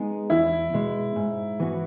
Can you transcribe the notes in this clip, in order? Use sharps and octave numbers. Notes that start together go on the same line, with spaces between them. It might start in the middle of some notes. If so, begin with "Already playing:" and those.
Already playing: G#3 B3 D#4 G#4
E2 E4
B2 G#3
G#2
E3 B3 F#4